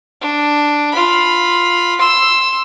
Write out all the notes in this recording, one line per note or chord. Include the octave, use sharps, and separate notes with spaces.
D4
F4 B5
C6 E6